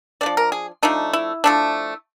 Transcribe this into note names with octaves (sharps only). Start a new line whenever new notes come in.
A3 D4 D5
F3
A#4
G#4
F3 A3 D4 D#4
E4
F3 A3 D4